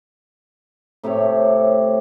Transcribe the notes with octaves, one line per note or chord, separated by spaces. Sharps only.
A2 C3 G4 C#5